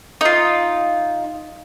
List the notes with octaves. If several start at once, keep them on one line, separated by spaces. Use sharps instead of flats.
D#4 F4